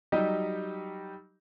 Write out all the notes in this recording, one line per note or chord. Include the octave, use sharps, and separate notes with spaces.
F#3 G3 D#4 G4 D#5